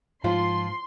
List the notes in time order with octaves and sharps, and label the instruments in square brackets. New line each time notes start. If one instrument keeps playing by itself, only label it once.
[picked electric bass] G#2 [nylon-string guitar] F3 [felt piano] F4 [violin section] C6